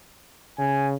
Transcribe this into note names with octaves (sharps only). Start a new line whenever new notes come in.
C#3 G#5